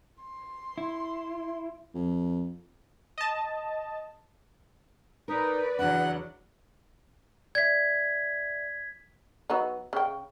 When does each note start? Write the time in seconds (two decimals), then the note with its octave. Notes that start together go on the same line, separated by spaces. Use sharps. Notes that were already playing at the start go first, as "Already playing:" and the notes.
0.23 C6
0.78 E4
1.95 F2
3.18 D#5 A5
5.28 D#4 A#4 B4 D5
5.79 E2 C#3 F#3 D4 F#5
7.55 D5 E5 G#6 B6
9.50 F#3 B3 D#4
9.93 C#3 G5